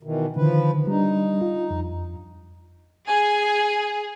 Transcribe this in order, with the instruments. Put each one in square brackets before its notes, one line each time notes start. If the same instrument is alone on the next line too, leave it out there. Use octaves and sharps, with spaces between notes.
[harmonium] B2 D#3 E3
[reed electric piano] D3 D#3 [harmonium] F3 B4
[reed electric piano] G3 D4 [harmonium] D#4
[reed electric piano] F4
F2
[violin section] G#4 [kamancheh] G#5